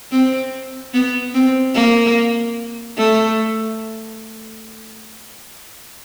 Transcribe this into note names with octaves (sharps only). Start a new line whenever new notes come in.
C4
B3
C4
A#3
A3